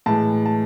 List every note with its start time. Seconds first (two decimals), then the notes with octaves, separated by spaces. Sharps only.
0.06 A2 E3 G#3 A5
0.46 A5